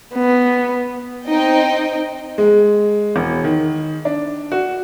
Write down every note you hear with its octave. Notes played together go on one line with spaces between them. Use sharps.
B3
C4 D#4 D#5 G5
G#3
E1
D#3
D4
F#4